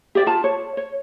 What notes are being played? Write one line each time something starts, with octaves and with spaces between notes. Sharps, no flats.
G4 D5 E5
F4 A5
C#5
C#5